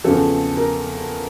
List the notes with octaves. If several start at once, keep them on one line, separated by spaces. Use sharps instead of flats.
E2 C#3 F3 A4
A#4